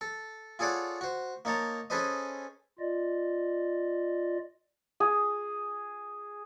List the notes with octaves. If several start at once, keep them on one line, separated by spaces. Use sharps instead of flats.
A4
F4 G#4 A4 C#5 D5 F#5
F#4 C5
A#3 D#4 C#5 A5 A#5
C#4 G#4 A4 B4 C5 D#5
F4 D5 D#5
G#4